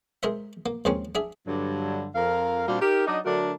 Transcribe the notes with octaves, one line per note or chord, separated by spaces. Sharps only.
G#3 A#4 C5 D#5 E5
A#3
D#2 F3 G#3 C4 C#4
D4 G#4 E5
G2 D3 F#3
F2 A#4 F5
A#2 G3 C4 D4 F#4 F5
D#4 G4 A#4
F#3 D4 D#4 D5 D#5
D3 F#3 A3 D4 F#4 A#4